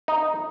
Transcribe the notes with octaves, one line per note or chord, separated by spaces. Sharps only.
D#4